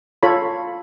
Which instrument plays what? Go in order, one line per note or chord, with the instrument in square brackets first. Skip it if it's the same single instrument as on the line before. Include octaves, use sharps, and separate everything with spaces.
[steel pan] F4 A4 C#5 B5